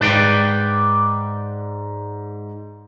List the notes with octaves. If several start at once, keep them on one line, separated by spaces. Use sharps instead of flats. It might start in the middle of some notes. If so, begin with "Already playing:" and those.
G#2 B4 D5 G5 G7